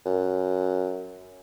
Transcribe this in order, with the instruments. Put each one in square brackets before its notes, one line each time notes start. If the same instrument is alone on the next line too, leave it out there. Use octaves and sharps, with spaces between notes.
[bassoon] F#2